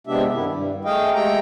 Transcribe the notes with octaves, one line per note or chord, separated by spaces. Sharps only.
C3 G#3 B3 D4 G4 E5
G2 D#3 E4
G2
A3 G#4 D#5 F5 G5
G#3 A3 G4 A4 G5 A#5